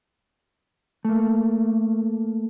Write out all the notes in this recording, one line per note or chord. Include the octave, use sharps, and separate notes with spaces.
A3 A#3